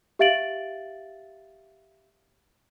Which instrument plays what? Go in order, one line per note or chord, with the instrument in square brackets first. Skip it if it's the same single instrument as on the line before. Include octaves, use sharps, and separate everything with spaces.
[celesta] G4 E5 F5 A6 D7 F#7